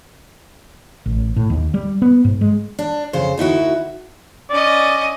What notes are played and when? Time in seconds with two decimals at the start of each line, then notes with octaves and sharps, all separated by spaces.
1.06 A1
1.36 A2
1.50 D#2
1.74 G3
2.02 B3
2.25 G#2
2.41 G#3
2.79 D4
3.13 F2 C#3 C5
3.38 D2 D#4 E4 F#4
4.50 C#4 D5 D#5